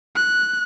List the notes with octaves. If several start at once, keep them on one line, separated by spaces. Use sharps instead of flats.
F#6